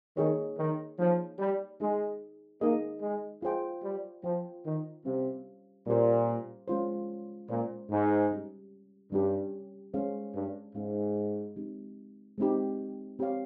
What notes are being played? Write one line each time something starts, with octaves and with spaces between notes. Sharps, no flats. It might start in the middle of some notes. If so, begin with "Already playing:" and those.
D#3 A#3 D#4 G#4 C#5
D#3
F3 A#3 D#4 G#4 C#5
G3
G#3 D#4 G#4 D#5
A#3 D#4 G#4 D#5
G#3
G#3 F4 C5 G5
G3
F3 F4 C5 G5
D#3
C3 G3 C#4 G4 C5 F5
A#2 G3 C#4 G4 C5 F5
G#3 C#4 F4 C5
A#2 G#3 C#4 F4 C5
G#2
G3 C#4 G4
G2 G3 C#4 G4
G#3 C#4 G#4 C5 F5
G2
G#2 G#3 C#4 G#4 C5 F5
G#3 C4 D#4 G4
G#3 C4 D#4 G4
C4 G4 C#5 F5